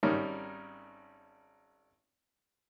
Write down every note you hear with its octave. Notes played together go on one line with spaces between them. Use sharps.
G#1 G3 C#4 D#4 A#4